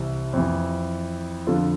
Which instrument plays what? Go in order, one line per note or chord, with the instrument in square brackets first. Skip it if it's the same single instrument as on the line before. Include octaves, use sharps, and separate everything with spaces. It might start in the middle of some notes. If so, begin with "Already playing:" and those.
Already playing: [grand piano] C2 C3 E3
F2 E3
F2 D3 F3 F4 A4